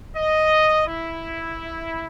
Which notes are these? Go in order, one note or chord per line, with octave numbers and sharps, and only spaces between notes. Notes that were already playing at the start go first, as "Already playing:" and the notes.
D#5
E4